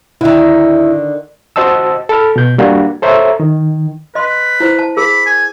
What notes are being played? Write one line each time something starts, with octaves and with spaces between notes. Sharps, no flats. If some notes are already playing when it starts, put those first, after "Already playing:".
D3 D#3 E4 E5
F#4 C5 D#5 A5 E6
A4 A5 B5 F6
B2 G6
G3 A#3 D4 F#4
A4 C5 C#5 E5 A#5
D#3
B4 D#5 C6
E4 C5
A5
G#4 A#4 B5
G#5